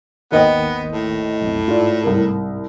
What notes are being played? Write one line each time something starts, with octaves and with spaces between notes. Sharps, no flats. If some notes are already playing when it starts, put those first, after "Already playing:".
G#1 D#2 D#3 B3 C5 D#5 G5
A2
B1 F2
G#2 F4 D5
C2 A#4